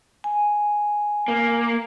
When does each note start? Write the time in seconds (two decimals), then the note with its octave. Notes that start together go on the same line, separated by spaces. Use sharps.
0.24 G#5
1.28 A#3